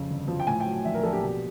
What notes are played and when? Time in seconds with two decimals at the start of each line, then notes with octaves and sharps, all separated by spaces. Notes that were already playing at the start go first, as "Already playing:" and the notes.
Already playing: F2 C#3
0.10 G1
0.28 F3
0.40 G5
0.47 A2 G#5
0.60 G5
0.66 F#3
0.85 A#1 E5
0.94 A#4
1.03 A#1 A4
1.13 G4
1.22 B2